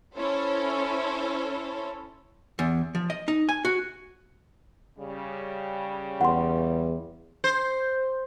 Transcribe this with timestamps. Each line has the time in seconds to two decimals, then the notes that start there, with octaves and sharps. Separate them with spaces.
0.16 C#4 E4 A4 C5 C#5
2.59 E2
2.95 F3
3.10 D#5
3.28 D#4
3.49 G#5
3.65 F#4
4.99 C#3 G3
6.21 E2 F#5 C6
7.44 C5